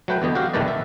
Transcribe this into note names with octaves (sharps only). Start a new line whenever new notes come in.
F#3 A3 B4 G5
E2 D3 B3 D#5
F#4 G4 F5
A#1 E2 D#3 A3 B4 D5
E5